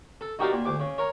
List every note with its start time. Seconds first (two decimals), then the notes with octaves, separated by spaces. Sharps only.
0.21 A4
0.39 D#4 F#4 G4 A#4 D5 F5
0.53 A#2
0.65 D2 D6
0.80 C#3
0.98 A#4 C#5